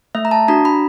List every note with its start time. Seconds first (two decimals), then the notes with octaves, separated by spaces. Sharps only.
0.15 A3 E5
0.25 A#5
0.31 A5
0.48 D4 F#4 A#5
0.65 B5